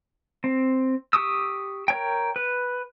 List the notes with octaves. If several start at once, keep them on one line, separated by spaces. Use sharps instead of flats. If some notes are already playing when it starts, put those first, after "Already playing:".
C4
G4 C#6 D#6 E6
A#4 C#5 G5
B4